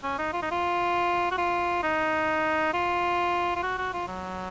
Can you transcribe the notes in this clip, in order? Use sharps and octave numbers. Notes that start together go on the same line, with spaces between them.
C#4
D#4
F4
D#4
F4
F#4
F4
D#4
F4
F4
F#4
F#4
F4
F#3